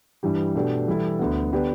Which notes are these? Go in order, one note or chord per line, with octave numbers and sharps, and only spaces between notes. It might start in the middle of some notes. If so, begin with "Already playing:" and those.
G2 E3 G3 D4 G4
B2 A3 D4 G4
E3 G3 E4 A4
D2 D3 B3
D3 B3 D4 G4 B4